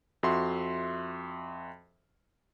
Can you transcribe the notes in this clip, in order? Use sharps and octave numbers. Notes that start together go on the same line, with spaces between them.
F2 F#4 E5 C6